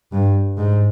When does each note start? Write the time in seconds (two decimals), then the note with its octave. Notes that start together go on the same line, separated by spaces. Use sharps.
0.12 G2
0.57 G#2